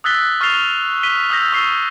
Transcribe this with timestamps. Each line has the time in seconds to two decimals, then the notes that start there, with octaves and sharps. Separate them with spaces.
0.04 D#6 E6 F#6 A6 B6 G7
0.41 C#6 F6 A6 C7 F7
1.03 B6 D#7 G7
1.30 D#6 E6 G6 A#6 B6
1.52 C#6 E6 F6 C7